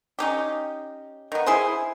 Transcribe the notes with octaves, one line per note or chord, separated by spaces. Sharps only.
C#4 D#4 G4
D#3 B3
E4 G#4 C5